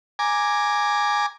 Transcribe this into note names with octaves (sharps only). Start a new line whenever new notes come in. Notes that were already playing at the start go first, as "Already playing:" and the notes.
G#5 A#5 D6